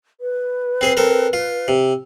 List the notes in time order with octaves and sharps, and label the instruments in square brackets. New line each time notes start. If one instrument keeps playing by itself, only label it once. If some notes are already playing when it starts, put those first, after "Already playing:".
[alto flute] B4
[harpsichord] C4 G#4 C5
C4 A4 A#4
F4
C3